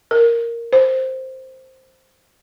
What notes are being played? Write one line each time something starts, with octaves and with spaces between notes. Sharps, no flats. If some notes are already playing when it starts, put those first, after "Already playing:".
A#4
C5